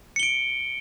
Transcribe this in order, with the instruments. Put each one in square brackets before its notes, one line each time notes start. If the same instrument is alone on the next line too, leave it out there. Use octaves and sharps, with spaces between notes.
[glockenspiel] C#7
G7
D7